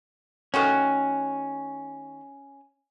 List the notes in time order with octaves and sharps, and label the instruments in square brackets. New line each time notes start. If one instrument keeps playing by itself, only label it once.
[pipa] D#3 A3 F#4 [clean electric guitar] C#4